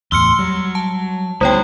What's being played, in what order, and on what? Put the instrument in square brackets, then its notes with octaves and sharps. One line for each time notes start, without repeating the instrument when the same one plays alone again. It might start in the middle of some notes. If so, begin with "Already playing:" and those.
[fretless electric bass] E2 A2 [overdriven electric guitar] C6 [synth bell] E6 F6 C#7
[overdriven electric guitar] F#3 [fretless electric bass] G3
[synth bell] A5
[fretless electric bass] D2 B3 [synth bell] G3 C#5 G5 [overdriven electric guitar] D#4 F#4